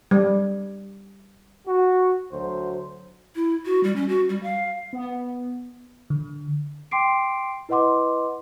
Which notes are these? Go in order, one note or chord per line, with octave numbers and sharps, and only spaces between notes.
G3
F#4
D2 F#3 C5
E4
F#4
G3
C#4
F#4
G3
F5
B3
D3
G5 C6 D6 C7 D7
E4 B4 D#5 F#5 C6 D6